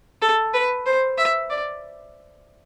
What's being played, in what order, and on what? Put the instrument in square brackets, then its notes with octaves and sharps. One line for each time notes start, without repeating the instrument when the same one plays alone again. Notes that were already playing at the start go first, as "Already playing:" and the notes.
[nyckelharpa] A4
B4
C5
E5
D5